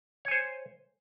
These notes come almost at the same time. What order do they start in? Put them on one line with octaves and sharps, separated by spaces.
C#5 G#5 C5